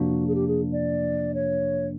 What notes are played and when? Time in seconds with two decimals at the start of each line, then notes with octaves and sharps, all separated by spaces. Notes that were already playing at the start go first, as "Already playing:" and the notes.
Already playing: F2 C3 F3 A#3 D4 F#4
0.27 G#4
0.34 G4
0.47 G#4
0.72 D5
1.34 C#5